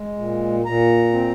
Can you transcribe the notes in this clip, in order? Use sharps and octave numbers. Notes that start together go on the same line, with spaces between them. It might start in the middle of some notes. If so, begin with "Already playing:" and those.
Already playing: G#3
A#2
A#2 A#5
C4